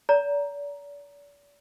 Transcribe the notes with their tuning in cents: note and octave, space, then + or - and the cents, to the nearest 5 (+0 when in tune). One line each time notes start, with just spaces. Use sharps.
D5 -40 A#5 +0